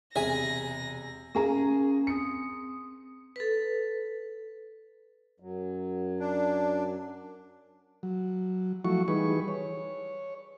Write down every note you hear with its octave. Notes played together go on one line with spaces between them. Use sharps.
E1 C3 G#4 E5 G#5 A#6
A#3 C#4 G#4 A#5
C4 D#6 C#7
A4 B4
F#2 F#3
D4
F#3
F3 F#3 A3 E4 F#4 C#6
E3 G3 D#4 G#4 B4 C#6
C#5